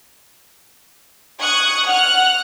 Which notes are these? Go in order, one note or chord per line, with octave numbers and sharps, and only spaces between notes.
C#6 D#6 F#6 G#6
F#5 F6 F#6